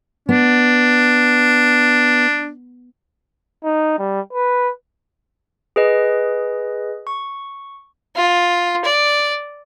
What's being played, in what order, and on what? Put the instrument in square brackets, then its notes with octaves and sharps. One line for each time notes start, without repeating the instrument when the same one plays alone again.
[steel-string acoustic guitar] B3 [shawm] D4
[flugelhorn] D#4
G3
B4
[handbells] G#4 B4 D#5
C#6
[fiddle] F4
D5